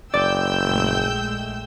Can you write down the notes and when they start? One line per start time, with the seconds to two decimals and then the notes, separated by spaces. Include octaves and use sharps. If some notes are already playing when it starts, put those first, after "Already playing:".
0.14 F#1 D5 G5 E6 G6
0.63 A#1 G#3 A3